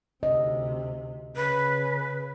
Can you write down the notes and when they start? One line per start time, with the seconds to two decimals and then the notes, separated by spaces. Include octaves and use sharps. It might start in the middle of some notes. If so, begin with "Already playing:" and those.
0.23 D2 C3 D#5
1.36 C#3 B4